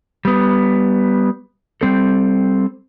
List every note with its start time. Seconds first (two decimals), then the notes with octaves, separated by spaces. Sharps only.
0.25 G3 B3
1.81 G3 C4 A4